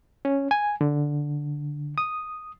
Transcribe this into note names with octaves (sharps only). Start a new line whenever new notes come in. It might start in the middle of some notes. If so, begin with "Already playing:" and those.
C#4
G#5
D3
D#6